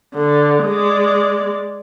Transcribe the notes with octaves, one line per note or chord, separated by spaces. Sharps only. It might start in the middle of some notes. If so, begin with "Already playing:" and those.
D3
G#3 D5